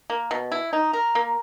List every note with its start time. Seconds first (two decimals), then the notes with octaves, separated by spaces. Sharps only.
0.10 A#3
0.31 B2
0.52 E4
0.73 D#4
0.93 A#4
1.15 A#3